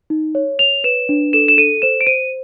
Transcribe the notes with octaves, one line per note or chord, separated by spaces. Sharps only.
D#4
C#5
C#5 F7
B4 E7
D4
A4 E7
E7
A4 D#7
C5 E7
D7
C5 D#7